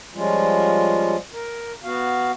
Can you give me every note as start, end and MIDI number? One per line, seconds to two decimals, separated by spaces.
0.15 1.16 53
0.15 1.16 55
0.15 1.16 56
0.15 1.16 61
0.15 1.16 65
1.33 1.73 70
1.84 2.31 59
1.84 2.31 66
1.84 2.31 77